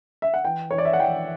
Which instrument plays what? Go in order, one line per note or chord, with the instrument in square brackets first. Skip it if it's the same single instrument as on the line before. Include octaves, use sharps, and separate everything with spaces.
[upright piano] E5
F#5
E3 G5
E3 C#5
D5
E5
F#5
E3 G5